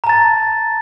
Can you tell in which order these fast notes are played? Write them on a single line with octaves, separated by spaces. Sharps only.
A#5 A5 A6